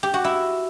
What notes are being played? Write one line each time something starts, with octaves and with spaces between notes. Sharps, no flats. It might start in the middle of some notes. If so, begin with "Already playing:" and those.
G4
F#4
E4